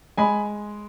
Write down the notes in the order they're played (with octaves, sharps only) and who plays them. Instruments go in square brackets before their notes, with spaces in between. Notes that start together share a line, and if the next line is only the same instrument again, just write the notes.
[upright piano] G#3 G#5 B5